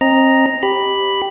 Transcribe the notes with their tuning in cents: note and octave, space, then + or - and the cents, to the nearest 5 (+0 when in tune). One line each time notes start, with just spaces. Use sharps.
C4 +30 D#5 +0 A#5 +0
G4 +0 B5 +0